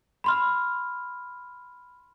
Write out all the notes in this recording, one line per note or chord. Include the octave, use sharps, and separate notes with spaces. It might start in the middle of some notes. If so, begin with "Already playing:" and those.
B5 C6 F6